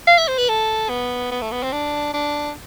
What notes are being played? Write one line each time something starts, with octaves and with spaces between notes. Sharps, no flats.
F5
E5
C5
B4
A4
B3
B3
A3
B3
C4
D4
D4